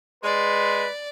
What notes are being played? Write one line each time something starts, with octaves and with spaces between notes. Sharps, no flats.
G#3 B4 D5 C6